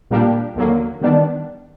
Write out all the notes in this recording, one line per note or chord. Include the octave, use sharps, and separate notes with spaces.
A#2 G3 A#3 D4 G4
D#2 D3 F#3 A#3
D#3 G3 B3 D4